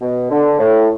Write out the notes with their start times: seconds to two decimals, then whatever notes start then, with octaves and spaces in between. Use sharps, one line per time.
0.01 B2
0.31 D3
0.59 A2